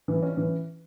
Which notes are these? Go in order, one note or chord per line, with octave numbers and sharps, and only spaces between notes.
E3
C#4
E3